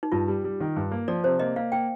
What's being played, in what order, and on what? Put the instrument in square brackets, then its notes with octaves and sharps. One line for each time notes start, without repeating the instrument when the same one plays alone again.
[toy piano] D#4
[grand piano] G2 [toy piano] F4
[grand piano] G3
G3
D#3
G2
A#3
[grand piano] F3 [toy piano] D5
[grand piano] C3 [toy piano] C5
[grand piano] A#3 [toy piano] D#5
[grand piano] A#3 [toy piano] F5
[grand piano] A#3 [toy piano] G5